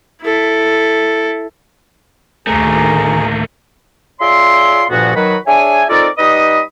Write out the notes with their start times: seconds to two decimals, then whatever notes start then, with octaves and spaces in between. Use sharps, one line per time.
0.22 E4 A4
2.47 D2 A2 D#3 A3 A#3 G#4 A#4
4.21 F4 G#4 C#5 D5 E5 C6
4.90 D2 G2 A#2 F3 B3 F#4
5.16 D#3 F#3 F#4 B4
5.47 D4 G#4 C#5 E5 G#5
5.89 C4 D#4 F4 A4 A#4 D5
6.18 G3 D#4 B4 D#5 B5 D#6